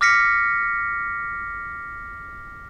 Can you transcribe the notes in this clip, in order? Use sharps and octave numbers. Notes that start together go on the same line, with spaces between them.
D6 F6 A#6 B6 C#7